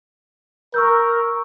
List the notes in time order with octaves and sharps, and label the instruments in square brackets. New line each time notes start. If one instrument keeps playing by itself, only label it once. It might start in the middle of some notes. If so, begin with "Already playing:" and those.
[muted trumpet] A#4 [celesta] C#6 E6 G6